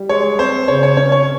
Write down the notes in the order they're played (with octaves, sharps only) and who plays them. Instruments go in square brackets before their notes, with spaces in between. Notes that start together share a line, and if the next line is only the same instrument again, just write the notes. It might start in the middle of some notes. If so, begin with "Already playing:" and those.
Already playing: [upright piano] G3
[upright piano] G#3 [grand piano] C#5
[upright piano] C4 [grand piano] C5
[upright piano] C#3 [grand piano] C#5
[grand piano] C#5
[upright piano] C#4 [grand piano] C#5
[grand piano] C#5